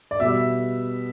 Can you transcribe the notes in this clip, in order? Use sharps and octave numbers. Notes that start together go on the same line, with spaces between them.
D5
B2 G3 E5